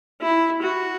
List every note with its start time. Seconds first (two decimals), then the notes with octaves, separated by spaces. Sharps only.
0.22 E4
0.62 F#4